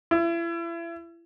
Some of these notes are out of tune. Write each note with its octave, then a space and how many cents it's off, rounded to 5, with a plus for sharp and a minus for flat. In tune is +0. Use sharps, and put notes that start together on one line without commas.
E4 +35